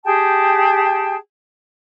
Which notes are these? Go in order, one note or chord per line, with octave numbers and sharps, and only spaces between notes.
G4 G#4 G5 A5